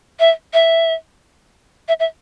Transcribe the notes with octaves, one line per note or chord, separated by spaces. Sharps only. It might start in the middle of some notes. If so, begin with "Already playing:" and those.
E5
E5
E5
E5